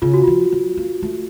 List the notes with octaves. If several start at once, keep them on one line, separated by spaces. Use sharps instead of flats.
C#3 F4
F#4
F3 F4
F#3
A#3
A3